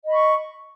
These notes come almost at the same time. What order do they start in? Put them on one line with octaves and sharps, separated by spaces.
D#5 B5 C#6